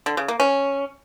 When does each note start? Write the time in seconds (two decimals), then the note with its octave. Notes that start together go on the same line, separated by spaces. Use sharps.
0.06 D3
0.17 C#3
0.28 A#3
0.40 C#4